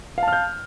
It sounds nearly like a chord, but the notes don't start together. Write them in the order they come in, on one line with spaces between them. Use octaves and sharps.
F5 A5 F6 G6